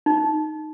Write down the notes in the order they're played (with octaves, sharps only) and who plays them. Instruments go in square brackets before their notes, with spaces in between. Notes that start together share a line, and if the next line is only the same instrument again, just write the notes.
[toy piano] D#4